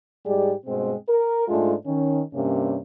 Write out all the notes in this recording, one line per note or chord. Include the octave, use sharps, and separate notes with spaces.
G#2 G3 G#3 G4 G#4 D5
G2 B2 G#3 C4
A#4
G#2 G#3 A3 D4 F4
D#3 C#4
G2 C3 A#3 C#4